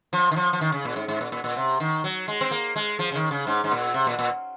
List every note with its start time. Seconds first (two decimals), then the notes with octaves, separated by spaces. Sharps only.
0.13 F3
0.31 D#3
0.36 F3
0.53 F3
0.61 D#3
0.72 C#3
0.85 A#2
0.96 G#2
1.08 G#2
1.21 A#2
1.32 A#2
1.44 A#2
1.56 C3
1.80 D#3
2.04 F#3
2.28 G#3
2.41 C4
2.51 A#3
2.76 G#3
2.99 F3
3.12 C#3
3.15 D#3
3.31 C#3
3.47 G#2
3.64 G#2
3.71 A#2
3.94 C3
4.07 A#2
4.19 A#2